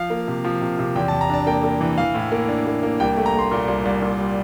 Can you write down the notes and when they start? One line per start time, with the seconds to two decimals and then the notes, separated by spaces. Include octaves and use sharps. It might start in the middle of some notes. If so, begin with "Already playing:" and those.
Already playing: F3 F5
0.10 A#3
0.28 C3
0.45 F3
0.62 C3
0.79 C3
0.96 E2 G5
1.08 A5
1.13 E2
1.21 A#5
1.29 D4 A5
1.47 A#3 G5
1.64 A#3
1.81 E3
1.98 E3 F5
2.15 A2
2.32 A#3
2.48 D4
2.66 A#3
2.83 A#3
3.00 C2 G5
3.17 A3
3.26 A#5
3.34 A3 C6
3.51 A#2
3.68 C2
3.85 C2
4.02 A#2
4.19 G3